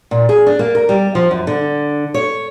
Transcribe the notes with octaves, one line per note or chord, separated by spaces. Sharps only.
A#2
G#4
D4
A#3
A#4
G3
F3
F#2
D3
C#5